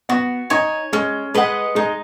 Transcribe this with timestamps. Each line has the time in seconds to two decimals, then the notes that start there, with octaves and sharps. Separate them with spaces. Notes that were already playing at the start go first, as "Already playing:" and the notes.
0.09 B3 F#4
0.50 D#4 C#5 G#5
0.93 G#3 C#4
1.34 G#3 B4 D#5 F#5
1.75 G#3 D#4